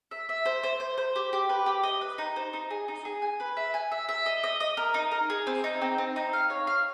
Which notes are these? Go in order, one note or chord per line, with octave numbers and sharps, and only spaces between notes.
E5
E5
C5
C5
C5
C5
G4
G4
B4
G4
D#5
B4
D#4
C5
D#4
G#4
D#4
G#4
G#5
B4
E5
G#5
E5
E5
D#5
D#5
D#5
A#4
D#4
A#4
G#4
C4
D#4
C4
C4
D#4
F5
C#5
F5